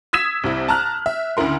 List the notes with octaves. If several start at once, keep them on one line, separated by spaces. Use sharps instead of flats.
D#6 E6 G#6 B6 E7
C2 C3 E4
A5 A#5 F6 F#6
E5
D2 C#3 E4 A#4 C6